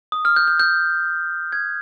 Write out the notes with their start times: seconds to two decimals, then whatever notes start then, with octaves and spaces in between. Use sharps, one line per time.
0.12 D#6
0.25 F6
0.36 G6
0.48 G6
0.60 G6
1.52 G#6